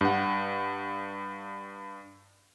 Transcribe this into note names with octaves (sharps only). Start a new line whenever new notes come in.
G2 F#5